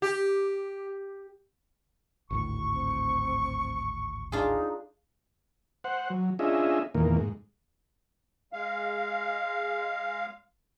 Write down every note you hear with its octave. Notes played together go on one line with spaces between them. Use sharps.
G4
G#1 D2 A2 C#6
C4
D4 D#4 F4 G#4
C5 F#5
F#3
C#4 D4 F4 G#4 D#5 E5
E2 A#2 D#3 A#3
G#2
G#3 F5